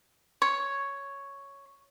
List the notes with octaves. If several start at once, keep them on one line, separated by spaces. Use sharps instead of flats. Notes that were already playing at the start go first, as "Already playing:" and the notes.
C#5